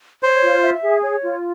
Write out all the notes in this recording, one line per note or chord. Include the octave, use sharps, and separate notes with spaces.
C5 C#5
F4
E5
G#4
C#5
F4